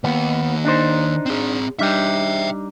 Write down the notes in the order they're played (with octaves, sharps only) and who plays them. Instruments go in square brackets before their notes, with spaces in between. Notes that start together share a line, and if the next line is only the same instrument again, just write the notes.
[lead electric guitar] D#3 A#3 [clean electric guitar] B3
[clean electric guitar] D4 D#4 C5
[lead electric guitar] C4 G#4
[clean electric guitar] G3 D4 D#4 [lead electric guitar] E5 G5